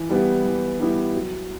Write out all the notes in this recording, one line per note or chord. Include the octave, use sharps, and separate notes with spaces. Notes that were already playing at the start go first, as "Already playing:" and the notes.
Already playing: E3
G3 B3 E4 G4
E3
G3 B3 E4 G4
F#3